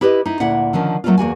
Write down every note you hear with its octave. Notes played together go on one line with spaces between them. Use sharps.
E4 G4 B4 D5 D#5
D#4 E4
D2 A#2 E4 F#5
D3 D#3 F3 C#4
F#3 A3 A#3 C4 C#4 F4
E2 A#3 F#4 G#5